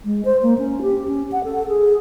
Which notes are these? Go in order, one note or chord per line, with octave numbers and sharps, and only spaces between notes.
G#3
C5
A#3
C#4
G4
C#4
F#5
A4
G#4